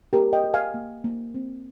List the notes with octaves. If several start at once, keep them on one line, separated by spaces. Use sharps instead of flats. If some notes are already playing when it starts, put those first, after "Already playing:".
A#3 G4 A#4
D#5 G5
G4
F5 G#5
A#3
A#3
C4